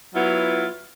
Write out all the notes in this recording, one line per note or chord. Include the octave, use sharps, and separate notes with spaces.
F#3 B3 E4 F4